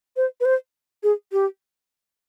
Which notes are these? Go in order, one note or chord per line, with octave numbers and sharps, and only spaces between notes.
C5
B4
C5
G#4
G4